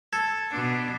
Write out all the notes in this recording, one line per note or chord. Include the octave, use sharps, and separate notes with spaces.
A4 G#6
B2 D4